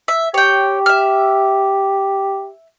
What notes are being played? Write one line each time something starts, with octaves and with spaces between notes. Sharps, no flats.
E5
G4 C#5 G5
E5 F6